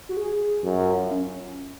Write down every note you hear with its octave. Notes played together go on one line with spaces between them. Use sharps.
F#4
G#4
F#2 F#4
F4
C#4